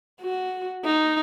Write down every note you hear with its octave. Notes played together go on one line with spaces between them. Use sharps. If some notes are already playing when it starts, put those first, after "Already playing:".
F#4
D#4